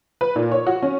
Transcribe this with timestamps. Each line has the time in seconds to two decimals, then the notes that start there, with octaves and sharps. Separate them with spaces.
0.21 B4
0.36 A#2
0.52 C#5
0.67 F#4
0.82 C#4